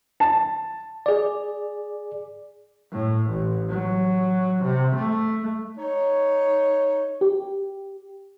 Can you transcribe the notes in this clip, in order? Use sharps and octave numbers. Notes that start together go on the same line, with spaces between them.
A5
G#4 D5
A2
A1
F#3
C3
A3
D#4 C#5
G4